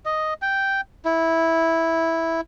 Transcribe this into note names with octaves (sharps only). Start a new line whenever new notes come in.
D#5
G5
E4